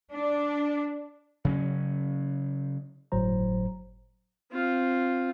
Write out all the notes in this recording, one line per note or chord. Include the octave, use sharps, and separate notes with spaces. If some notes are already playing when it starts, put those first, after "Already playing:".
D4
C#3 F#3 C#4
G1 A2 F#3 C5 A#5
C4 F4